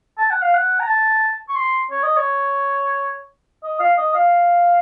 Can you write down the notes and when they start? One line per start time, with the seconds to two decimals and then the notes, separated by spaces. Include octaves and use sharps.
0.18 A5
0.30 F#5
0.42 F5
0.54 F#5
0.80 A#5
0.87 A5
1.49 C#6
1.56 C6
1.91 C#5
2.03 D#5
2.17 C#5
3.63 D#5
3.80 F5
3.98 D#5
4.15 F5